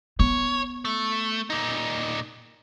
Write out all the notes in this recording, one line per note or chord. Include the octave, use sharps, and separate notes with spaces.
B3 C#5
A3
A#2 D#4